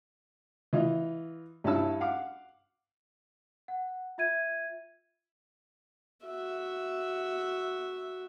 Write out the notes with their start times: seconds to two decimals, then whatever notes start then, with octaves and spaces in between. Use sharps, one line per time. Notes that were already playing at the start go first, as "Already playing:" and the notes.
0.73 E3 F4 D#5
1.64 G2 C#4 E4 A5 E6
2.01 F5 F#5 D6
3.68 F#5
4.18 F4 E5 G#6 D#7
6.26 F#4 E5